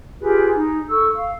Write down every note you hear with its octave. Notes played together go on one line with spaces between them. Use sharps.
F4 G4 G#4 B4
D#4
A4 C#6 E6
F5